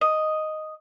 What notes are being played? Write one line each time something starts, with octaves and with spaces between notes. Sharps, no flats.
D#5